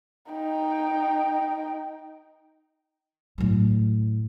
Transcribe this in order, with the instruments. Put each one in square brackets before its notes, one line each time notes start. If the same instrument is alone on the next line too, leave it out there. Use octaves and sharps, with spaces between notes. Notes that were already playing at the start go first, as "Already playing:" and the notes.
[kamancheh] D#4 G5
[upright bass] A2 F#3